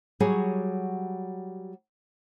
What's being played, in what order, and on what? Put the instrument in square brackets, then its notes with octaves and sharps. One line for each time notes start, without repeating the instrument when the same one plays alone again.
[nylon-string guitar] F#3 G3 F#4 G#4 C#5